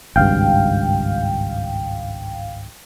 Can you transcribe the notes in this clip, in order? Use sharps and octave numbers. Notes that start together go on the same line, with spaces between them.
G#1 C#2 G2 F5 G5